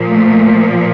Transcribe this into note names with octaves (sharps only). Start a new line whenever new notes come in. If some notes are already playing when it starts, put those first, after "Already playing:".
Already playing: A#2 F3
A3